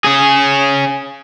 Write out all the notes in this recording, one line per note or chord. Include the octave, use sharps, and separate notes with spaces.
C#4 G#4